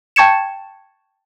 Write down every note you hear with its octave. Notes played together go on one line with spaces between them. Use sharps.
G5 A5 C#6 G#6 C#7 E7